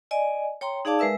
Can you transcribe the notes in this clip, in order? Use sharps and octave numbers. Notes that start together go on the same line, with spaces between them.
D5 D#5 G#5
C#5 G5 A#5 C6
D#4 G#4 D5 F5 A5 D6
G#3 A#4 B4 E5 E6